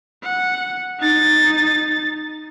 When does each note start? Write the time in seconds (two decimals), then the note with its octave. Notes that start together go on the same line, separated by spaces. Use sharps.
0.24 F#5
1.00 D#4 A6